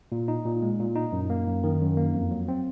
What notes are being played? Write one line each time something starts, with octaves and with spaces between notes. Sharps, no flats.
A#2
D#4
A#2
G#3
A#2
D#4
F#2
A#3
F#2
D#3
F#2
A#3
F2
F#3
C4